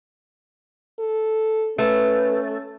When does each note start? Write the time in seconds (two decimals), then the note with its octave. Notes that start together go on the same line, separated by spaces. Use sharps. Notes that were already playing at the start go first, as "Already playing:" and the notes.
0.99 A4
1.78 A3 C#4 B4